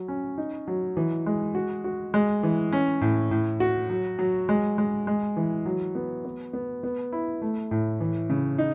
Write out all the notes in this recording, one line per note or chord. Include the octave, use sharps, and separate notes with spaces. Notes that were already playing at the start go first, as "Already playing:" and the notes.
Already playing: F#3
C#4
D#4
F#3
E3
G#3
F#4
F#4
G#3
E3
C#4
A2
A2
F#4
F#3
F#3
G#3
G#3
G#3
E3
F#3
B3
B3
B3
B3
E4
A3
A2
E3
C#3
D#4